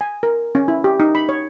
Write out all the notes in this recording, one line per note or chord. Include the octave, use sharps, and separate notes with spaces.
G#5
A#4
C#4
E4
G4
D#4
B5
C#5